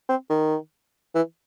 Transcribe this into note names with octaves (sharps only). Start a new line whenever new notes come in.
C4
D#3
E3